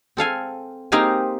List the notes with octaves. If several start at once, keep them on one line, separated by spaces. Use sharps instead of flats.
C4 A4 F5 G#5
A#3 C4 D#4 G4 F5 G#5